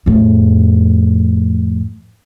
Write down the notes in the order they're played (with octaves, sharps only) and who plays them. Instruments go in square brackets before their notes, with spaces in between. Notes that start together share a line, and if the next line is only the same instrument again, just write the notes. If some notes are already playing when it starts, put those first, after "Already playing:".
[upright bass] F2 A2